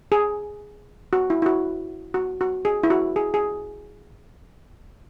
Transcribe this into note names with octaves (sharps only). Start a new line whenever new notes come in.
G#4
F#4
E4
E4
F#4
F#4
F#4
G#4
E4
F#4
G#4
G#4